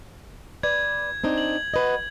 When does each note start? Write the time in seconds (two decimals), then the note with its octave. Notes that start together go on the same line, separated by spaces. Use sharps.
0.63 B4 D5 G#6
1.24 C4 D4 D#4
1.38 F#7
1.74 F#4 B4 D#5